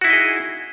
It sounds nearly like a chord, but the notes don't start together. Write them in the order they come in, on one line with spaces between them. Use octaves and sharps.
F#4 E4 D#4 D#5 G#4